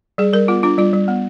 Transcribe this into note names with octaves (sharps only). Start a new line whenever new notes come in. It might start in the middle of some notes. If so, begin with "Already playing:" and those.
G3 G#4
G3 A#4
B3 F4
D4 F4
G3 F4
G3
B3